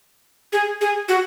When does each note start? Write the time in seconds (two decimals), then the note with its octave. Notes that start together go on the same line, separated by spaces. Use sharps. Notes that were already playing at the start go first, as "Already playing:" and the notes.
0.53 G#4
0.81 G#4
1.08 F#4